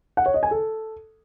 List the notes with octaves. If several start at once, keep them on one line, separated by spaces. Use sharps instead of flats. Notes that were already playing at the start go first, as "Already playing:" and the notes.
F#5
C#5
D#5
G#5
A4